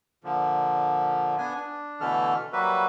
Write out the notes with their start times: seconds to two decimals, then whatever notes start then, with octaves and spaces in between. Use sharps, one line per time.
0.24 A#2 D3 F3
1.38 B3 D4 G#5
1.55 D4
2.01 B2 D3 E3 A3 A4 F6
2.53 F#3 G3 A#3 F#4 B4 E5